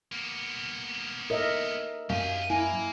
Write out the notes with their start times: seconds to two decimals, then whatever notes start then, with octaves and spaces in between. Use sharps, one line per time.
0.12 A#3 B3
1.30 A4 A#4 D#5 E5
2.10 F#2 G4 F5 G#5
2.50 A#3 E4 G#5